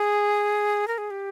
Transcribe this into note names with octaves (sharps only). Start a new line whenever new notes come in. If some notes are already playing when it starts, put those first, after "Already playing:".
Already playing: G#4
A#4
G#4
G4